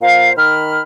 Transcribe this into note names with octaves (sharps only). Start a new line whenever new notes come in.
A#2 C5 F5
D#3 B5 F6